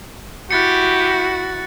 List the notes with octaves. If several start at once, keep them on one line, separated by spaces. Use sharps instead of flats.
E4 F#4 G4 F#6 A6 C#7